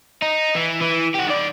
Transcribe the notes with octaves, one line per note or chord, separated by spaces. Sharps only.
D#4
E3
E3
G4 F#5
D#3 D5